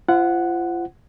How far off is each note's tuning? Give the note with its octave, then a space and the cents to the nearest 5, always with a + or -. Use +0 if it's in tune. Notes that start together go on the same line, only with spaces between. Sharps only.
F4 -35 C5 -10 F#5 +0